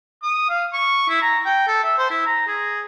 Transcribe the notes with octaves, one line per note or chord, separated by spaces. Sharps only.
D#6
F5
C#6
E4
A#5
G5
A4
E5
C5
E4
A#5
G#4